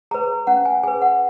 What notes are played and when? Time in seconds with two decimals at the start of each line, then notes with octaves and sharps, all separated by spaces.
0.11 G#4 B4 A#5
0.47 C#4 F#5
0.65 G#5
0.83 G#4 B4 G#5
1.02 F#5